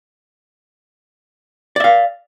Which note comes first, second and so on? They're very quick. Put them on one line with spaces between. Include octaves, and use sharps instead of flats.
D5 E5 F5